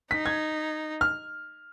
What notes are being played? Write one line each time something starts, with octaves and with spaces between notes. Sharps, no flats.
D#4 B6
G#6
F6